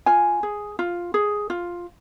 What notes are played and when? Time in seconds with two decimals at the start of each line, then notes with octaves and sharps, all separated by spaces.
0.06 F4 G#5
0.43 G#4
0.79 F4
1.14 G#4
1.50 F4